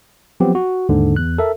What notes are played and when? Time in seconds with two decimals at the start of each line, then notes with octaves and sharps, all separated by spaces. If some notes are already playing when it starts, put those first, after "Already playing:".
0.40 F3 F#3 B3 C4 G4
0.55 F#4
0.89 D#2 G#2 D3
1.16 E2 F#6
1.38 A4 A#4 E5